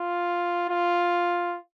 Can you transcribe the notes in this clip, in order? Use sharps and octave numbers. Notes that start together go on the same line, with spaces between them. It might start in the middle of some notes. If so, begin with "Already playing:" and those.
Already playing: F4
F4